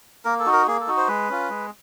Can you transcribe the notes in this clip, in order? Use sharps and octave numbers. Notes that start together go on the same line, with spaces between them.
A#3 A#4
A4
D#4 F#4
A#4
A#3 G#4
A4
D#4 F#4
C5
G#3 B4
C#4 F4
G#3